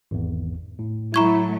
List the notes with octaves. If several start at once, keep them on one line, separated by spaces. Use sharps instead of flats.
G#1 E2
A2
F#3 A3 E4 A#5 C#6 G#6